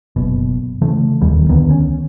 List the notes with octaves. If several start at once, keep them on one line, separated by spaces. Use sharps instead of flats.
F#1 B2
C#3 E3 A3
D#1 E2 D#3 G3
C#2 D3 D#3 B3
C#4